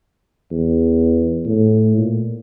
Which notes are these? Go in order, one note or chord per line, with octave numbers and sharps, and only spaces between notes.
E2
A2
A#2